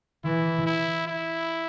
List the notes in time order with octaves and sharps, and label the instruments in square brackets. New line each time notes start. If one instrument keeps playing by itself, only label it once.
[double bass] E3 [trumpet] E4
[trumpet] E4
E4